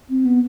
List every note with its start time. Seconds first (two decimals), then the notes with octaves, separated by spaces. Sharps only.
0.10 C4
0.25 B3